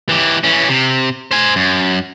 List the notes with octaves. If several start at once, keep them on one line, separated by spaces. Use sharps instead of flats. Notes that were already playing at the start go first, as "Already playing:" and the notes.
E3 G4
E3 C#4
C3
C5 G#5
F#2